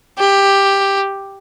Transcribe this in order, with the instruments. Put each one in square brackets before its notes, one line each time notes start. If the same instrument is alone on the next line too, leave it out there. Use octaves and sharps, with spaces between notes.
[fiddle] G4